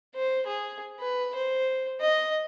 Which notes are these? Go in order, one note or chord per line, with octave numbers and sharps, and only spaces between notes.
C5
G#4
B4
C5
D#5